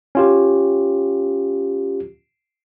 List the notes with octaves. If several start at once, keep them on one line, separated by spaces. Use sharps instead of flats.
C#4 F4 G4